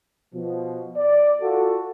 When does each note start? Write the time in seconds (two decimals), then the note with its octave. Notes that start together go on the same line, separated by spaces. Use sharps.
0.35 B2 F3
0.97 D5
1.42 F4 F#4 A4